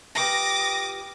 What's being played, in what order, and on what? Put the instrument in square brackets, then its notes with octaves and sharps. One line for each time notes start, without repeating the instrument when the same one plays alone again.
[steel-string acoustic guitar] F4 G4 B4 [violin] D6 D#6 [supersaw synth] A#6